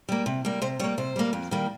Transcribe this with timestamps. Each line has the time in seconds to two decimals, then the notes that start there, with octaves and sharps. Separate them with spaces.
0.09 G3 A#3
0.26 C3
0.45 G3 A#3
0.62 C3 C5
0.79 G3 C#5
0.84 A#3
0.98 C3 C5
1.16 G3 A#3
1.33 F2
1.51 D#3 G3 A#3